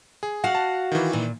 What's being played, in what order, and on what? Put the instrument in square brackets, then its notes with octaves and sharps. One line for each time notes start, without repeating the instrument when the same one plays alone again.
[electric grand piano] G#4
[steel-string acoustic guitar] F#4 F5 F#5
[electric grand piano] A5
D#3 E3
[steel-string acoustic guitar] A#2